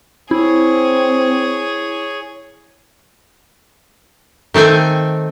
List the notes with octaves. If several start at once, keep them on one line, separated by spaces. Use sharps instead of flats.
C4 E4 G#4 C#5
D#3 A3 C4 G5 G#5